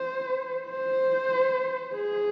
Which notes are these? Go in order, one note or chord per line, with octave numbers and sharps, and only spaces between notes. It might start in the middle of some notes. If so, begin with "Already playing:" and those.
Already playing: C5
C5
G#4